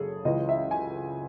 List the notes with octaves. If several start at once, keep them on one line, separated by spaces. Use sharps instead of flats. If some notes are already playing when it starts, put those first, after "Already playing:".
Already playing: F#1 F#2 C#3 G#4 A4
C#2 C#3 E3 D#5
E5
G#5